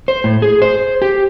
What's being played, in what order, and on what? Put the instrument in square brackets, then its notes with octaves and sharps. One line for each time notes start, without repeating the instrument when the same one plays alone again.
[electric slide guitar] C5
A2
G#4
C5
G4